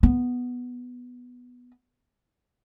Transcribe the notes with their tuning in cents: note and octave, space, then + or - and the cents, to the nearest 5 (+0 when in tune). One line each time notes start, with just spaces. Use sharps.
B3 +0